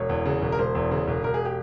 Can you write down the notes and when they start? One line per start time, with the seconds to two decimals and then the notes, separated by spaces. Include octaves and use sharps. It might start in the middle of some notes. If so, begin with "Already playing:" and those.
Already playing: E1 C#5
0.09 E2
0.25 C#3
0.42 E1
0.52 A#4
0.59 E1 C5
0.75 E2
0.91 C#3
1.07 E1
1.24 E1 A#4
1.34 G#4
1.45 G4